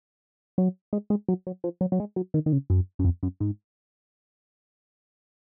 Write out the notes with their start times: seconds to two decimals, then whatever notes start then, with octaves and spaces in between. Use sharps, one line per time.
0.58 F#3
0.93 G#3
1.10 G#3
1.28 F#3
1.47 F#3
1.64 F3
1.81 F#3
1.92 F#3
2.00 G#3
2.16 F#3
2.34 D#3
2.46 D#3
2.52 C#3
2.70 F#2
2.99 F#2
3.05 F2
3.23 F#2
3.40 G#2